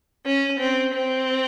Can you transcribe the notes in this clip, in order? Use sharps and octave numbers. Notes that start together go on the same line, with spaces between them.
C#4
C4
C4